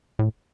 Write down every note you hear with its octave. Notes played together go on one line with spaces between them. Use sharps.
A2